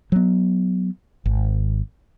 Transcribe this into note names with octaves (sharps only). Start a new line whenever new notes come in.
F#3 B3
G#1